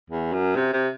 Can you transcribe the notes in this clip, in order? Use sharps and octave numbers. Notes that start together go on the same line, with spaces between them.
E2
F#2
C3
C3